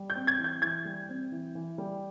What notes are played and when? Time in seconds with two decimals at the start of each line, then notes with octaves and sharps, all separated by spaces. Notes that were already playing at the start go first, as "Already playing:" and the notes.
Already playing: G3
0.10 G6
0.15 C4
0.27 G#6
0.38 E3
0.44 G6
0.62 E3 G#6
0.85 G3
1.09 C4
1.32 E3
1.55 E3
1.78 G3